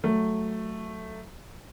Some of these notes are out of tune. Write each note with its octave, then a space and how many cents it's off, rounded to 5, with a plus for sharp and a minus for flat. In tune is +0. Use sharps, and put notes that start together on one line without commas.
F#3 +0 A3 +0